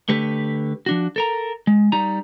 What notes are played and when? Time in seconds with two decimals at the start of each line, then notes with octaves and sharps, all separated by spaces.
0.09 D3 A3 G4 B4
0.86 F3 D4 F#4
1.16 A4 A#4 A#5
1.67 G#3
1.92 G3 D#4 A#5